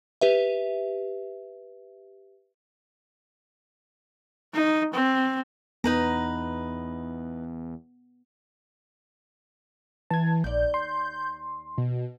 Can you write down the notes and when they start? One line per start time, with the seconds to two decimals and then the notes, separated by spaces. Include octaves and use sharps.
0.21 G4 B4 E5
4.54 D#4
4.94 C4
5.84 E2 B3 D#4 B4 A#5
10.10 E3 A5 G#6
10.44 A#1 D#2 D5 G6
10.74 C6
11.78 B2